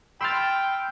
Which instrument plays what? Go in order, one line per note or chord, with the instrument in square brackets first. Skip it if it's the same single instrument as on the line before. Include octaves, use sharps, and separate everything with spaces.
[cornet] G5 [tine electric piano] B5 C6 F6 [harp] E6 G6 A6